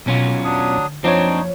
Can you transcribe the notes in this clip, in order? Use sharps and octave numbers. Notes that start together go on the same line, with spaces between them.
B1 B2 F#3 C4 C#4 F4
E2 F#3 D4 D#6
D3
F#1 F3 C4 D4 D#4 C#5